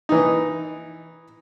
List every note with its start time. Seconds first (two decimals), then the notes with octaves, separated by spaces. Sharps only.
0.09 E3 D#4